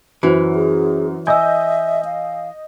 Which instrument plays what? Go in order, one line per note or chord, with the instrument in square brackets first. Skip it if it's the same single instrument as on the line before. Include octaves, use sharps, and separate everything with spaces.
[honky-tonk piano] F#2 [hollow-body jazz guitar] E3 [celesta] F#4 C5
[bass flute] G#4
[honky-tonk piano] D#5 G6 [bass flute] E5 [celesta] G#5 E6
[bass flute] F5